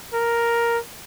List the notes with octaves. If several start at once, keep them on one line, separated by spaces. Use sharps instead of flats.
A#4